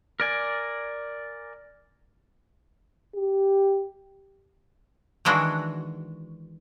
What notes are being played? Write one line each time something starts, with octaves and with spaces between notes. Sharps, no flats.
A#4 D5 G#5
G4
D#3 E3 G#3 D4 F#4